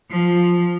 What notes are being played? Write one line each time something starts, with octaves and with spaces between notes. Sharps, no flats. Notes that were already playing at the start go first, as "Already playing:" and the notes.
F3